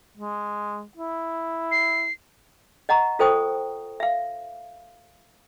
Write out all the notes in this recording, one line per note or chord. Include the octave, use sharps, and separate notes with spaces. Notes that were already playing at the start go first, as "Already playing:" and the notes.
G#3
E4
C7
D#5 F#5 A#5 C#6
F4 A4 C5 G5 C#6 D#6
E5 F5